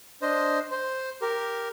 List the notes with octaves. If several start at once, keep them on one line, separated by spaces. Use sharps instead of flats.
D4 C5 D#5
C5
G4 A#4